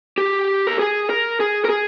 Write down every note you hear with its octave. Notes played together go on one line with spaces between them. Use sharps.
G4
A#4
G#4
A#4
G#4
A#4
G#4